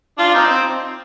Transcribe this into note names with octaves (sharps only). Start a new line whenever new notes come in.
D4 F4
C4 D#4
C4